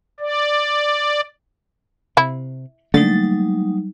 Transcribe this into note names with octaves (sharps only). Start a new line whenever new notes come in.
D5
C3 E4
D3 F#3 G3 A3 A#3 D#4 A6